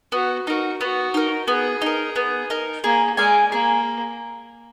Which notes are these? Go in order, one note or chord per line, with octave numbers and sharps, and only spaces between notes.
B3 F#4
D#4 F#4 A#4
B3 F#4
D#4 A#4
B3 G#4
D#4 A#4
B3
D#4 A#4
A#3 G#4
G#3 D5 F5 G#5
A#3 G#4